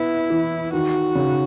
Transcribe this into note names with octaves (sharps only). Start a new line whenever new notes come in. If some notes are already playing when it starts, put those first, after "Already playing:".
Already playing: B3 E4
E3
D#3 F#4
C#3